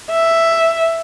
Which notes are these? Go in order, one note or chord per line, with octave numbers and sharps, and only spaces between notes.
E5